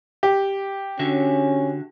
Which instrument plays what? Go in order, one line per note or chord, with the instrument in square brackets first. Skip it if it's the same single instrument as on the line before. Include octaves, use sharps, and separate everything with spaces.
[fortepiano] G4
[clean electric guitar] D3 F#4 E5 [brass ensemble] C#4